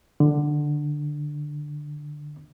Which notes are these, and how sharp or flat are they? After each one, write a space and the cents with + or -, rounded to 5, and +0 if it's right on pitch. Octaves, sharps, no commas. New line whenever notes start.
D3 +10